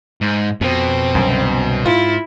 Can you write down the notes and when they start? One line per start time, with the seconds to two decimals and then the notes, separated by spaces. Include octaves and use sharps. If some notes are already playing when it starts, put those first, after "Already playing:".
0.21 G#2
0.61 F2 B2 C4
1.15 C2 F#2 D3
1.86 G#2 E4 F4